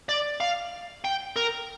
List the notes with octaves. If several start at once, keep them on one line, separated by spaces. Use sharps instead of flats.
D5
F5
G5
A#4